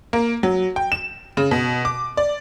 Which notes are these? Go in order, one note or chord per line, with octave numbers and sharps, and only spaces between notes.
A#3
F#3
G5
E7
C#3
B2
D6
D5